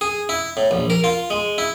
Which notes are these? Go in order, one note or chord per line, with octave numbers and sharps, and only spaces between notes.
G#4
E4
A2
A#1
A#4
F4
G#3
E4